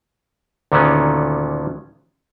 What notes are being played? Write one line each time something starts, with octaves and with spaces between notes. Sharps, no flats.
D2 A#2 D3 D#3 B3 C#4